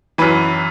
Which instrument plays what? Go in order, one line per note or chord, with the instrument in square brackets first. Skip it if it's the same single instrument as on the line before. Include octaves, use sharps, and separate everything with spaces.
[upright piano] F#2 E3 B4